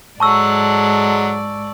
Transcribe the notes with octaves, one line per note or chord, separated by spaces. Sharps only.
G#2 F#3 G#3 A4 D5 A5 C#6 E6